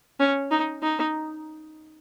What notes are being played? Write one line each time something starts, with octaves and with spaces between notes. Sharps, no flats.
C#4
D#4
D#4